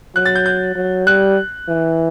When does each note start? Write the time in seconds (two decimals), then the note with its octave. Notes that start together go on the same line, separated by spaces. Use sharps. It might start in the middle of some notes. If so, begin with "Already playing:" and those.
0.15 F#3 F#6
0.25 A6
0.35 G6
0.46 G6
0.76 F#3
1.06 G3 F#6
1.68 E3